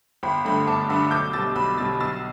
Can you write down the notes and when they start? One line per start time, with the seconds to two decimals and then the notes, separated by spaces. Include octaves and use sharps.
0.23 G1 G5 B5
0.45 G2 D3 A3 G5 B5
0.67 G1 A5 D6
0.89 G2 D3 A3 B5 E6
1.11 B1 D6 G6
1.33 B2 G3 E6 A6
1.55 B1 B5 E6
1.78 B2 G3 A6
2.00 B1 E6 A6